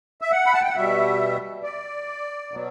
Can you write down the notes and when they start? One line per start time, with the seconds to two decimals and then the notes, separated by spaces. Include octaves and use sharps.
0.21 E5
0.32 F#5
0.46 B5
0.54 A5
0.62 G5
0.68 F#5
0.75 B2 G3 E5
1.63 D5
2.52 B2 F#3